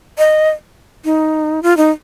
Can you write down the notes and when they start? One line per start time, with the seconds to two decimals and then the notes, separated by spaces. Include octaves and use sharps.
0.18 D#5
1.05 D#4
1.63 F4
1.77 D#4